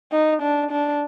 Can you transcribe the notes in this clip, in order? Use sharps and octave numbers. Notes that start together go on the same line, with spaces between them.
D#4
D4
D4